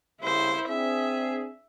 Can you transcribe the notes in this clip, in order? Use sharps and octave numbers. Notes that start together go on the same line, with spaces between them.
C2 C#3 E4 C5
C4 D4 G#4 E5